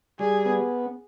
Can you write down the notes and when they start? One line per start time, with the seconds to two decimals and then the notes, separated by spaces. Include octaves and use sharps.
0.19 G3 G#4
0.46 B3